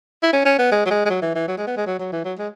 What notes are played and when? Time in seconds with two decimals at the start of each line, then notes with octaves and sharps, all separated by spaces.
0.23 E4
0.33 C#4
0.46 C#4
0.59 B3
0.72 G#3
0.86 F#3
0.91 G#3
1.06 G#3
1.10 F#3
1.22 E3
1.35 E3
1.48 F#3
1.58 G#3
1.67 B3
1.77 G#3
1.87 F#3
1.99 F#3
2.13 E3
2.25 F#3
2.39 G#3